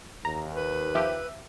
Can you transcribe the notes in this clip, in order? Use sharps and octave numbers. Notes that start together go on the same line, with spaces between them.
D#2 A#5
B4
F3 G4 E5